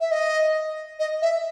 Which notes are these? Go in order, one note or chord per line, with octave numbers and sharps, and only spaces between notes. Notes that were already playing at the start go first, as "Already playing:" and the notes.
E5
D#5
D#5
E5